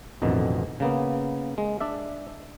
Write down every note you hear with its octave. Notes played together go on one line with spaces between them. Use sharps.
A1 F2 B2 D3 D#3
C#3 A#3 B3
G#3
D4 D5 E5